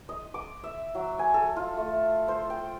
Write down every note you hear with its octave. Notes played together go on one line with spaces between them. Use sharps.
D#5
D6
E5
F#3
G#5
A4
F4
A3
C5
G5